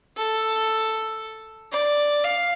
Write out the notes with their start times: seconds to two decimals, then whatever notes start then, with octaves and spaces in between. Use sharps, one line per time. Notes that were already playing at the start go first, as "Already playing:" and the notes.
0.17 A4
1.72 D5
2.25 F5